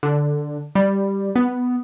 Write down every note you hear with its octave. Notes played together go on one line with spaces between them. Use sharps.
D3
G3
B3